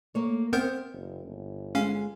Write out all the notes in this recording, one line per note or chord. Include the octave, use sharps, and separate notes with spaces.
A3 A#3 C#5
B3 C4 A#4 E5 G6
F#1
G1
G#3 C#4 F5